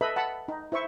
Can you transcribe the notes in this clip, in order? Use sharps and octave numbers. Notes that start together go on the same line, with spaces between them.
A4 B4 D#5 E5 B5
F#5 A5 B5
D#4
E4 C5 E5 C#6